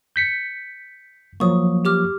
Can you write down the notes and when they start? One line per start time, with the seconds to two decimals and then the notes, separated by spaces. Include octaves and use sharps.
0.16 G6 B6 C#7
1.40 F3 F#3 A#3 C#6 D#6
1.85 G4 D6 F6